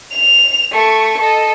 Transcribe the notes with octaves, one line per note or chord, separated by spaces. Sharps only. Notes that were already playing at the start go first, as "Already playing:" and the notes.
F7
A3 C#6
A4 D#5